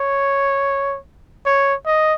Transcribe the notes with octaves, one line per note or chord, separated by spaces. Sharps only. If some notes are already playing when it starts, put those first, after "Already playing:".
Already playing: C#5
C#5
D#5